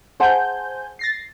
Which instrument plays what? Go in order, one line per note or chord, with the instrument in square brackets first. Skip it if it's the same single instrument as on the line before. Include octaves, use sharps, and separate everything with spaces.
[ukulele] G#4 F#5 A5 [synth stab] C5 G#5 G6
[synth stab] A6 A#6 C7